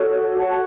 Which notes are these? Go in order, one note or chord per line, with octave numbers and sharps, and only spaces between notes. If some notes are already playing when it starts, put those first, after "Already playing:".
Already playing: F#4 A4 C#5
F#4 C#5 F#5 A5